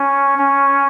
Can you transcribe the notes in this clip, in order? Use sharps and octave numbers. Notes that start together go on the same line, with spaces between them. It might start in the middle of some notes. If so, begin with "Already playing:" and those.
Already playing: C#4
C#4